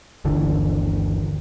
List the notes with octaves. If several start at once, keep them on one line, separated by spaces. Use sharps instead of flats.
G1 D#2 D3 E3